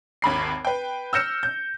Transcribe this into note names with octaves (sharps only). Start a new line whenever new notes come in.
G#1 D#2 B5 C7
B4 G5
E6 F6 G6 A#6 C#7 E7
G6